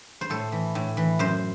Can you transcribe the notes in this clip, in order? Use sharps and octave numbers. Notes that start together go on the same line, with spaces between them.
C5
A2 A4
E3
A2
E3
F#2 C5